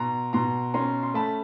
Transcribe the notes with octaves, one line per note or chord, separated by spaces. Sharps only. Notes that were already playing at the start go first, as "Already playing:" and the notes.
Already playing: B2 A#5 C6
B2 A#5 C6
C#4 A#5 C6
C6
A3 A5 B5